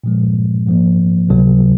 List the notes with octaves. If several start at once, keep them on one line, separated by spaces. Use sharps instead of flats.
A#2 F3 G#3
G#2 F3 A#3
C#2 C3 F#3